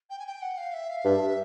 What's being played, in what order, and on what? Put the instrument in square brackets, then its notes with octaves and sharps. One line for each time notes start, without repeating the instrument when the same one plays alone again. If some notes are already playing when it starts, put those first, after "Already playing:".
[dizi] G5
G#5
G5
F#5
F5
E5
F5
[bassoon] G2 [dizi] E5